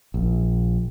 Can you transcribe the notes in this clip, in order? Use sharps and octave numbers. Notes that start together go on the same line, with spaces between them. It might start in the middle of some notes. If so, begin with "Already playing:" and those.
A#1